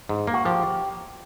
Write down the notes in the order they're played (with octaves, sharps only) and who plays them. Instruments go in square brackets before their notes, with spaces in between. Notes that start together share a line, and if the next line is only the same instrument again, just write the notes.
[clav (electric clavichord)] G#2
A#3
[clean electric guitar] F#4
[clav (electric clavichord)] F3 [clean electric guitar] G4